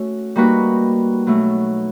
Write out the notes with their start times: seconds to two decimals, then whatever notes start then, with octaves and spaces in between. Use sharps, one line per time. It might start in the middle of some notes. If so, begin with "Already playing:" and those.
Already playing: A3 C#4 F#4
0.36 G3 A#3 D#4 F#4 B4
1.26 B2 F#3 A3